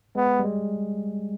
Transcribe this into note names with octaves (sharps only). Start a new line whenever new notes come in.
G#3 B3
G3
G#3